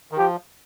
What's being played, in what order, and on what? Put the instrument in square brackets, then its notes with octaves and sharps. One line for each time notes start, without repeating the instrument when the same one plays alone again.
[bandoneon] D#3
[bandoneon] F3 [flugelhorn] G4